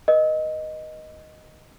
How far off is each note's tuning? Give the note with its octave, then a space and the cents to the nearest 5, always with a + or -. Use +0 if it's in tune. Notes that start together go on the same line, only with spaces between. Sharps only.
B4 -35 D#5 +0